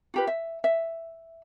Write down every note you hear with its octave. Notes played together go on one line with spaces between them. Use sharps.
F4 G4 B4
E5
E5